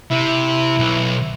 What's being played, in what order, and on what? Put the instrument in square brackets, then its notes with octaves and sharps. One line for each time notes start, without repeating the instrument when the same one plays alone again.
[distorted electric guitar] C3 [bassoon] E4
[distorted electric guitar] B1